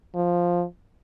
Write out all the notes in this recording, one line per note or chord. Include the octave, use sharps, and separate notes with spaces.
F3